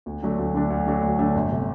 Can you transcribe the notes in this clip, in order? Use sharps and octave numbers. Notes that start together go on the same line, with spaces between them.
D2
D3 F#3 A3 D4
D2
D3 F#3 A3 D4
D2
D3 F#3 A3 D4
D2
D3 F#3 A3 D4
G1
C3